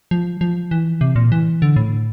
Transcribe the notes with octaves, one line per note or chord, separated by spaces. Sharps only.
F3
F3
E3
C3
A#2
E3
D3
A2